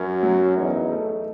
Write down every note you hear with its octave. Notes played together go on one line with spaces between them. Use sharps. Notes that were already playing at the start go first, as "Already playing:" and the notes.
Already playing: F#2 C#4
F#3
E2 D#4
A3